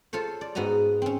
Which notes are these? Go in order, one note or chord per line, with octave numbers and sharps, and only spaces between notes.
F4 A4 C5 C#5
D5
G#2 B3 F#4 D#5 A#5
C4 C#4